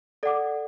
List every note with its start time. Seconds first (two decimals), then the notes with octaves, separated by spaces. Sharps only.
0.23 A4 D5 F#5 D6